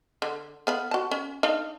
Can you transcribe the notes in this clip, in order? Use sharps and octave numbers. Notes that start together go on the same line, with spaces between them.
D3
B3 F5 B5
F#4 A5
C#4
D4 D#4 F5